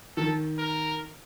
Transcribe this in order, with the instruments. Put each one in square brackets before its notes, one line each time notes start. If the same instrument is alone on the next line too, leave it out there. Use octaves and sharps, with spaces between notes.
[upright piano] D#3 [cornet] A4
[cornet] A#4